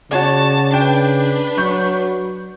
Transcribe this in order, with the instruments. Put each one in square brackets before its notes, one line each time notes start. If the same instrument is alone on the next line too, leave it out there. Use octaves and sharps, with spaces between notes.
[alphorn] C#3 [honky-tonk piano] F#4 C#5 D5 [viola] A5
[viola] D4 B4 [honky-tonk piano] G5
[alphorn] F#3 [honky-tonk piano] C#6 G6